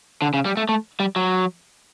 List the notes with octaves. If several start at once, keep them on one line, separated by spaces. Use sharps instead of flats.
D3
C#3
G3
A3
A3
G3
F#3